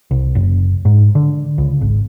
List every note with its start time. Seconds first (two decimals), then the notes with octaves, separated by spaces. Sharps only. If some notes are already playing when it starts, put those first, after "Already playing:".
0.11 C2
0.35 F#1
0.85 G#2
1.15 D3
1.58 C#2
1.81 G#1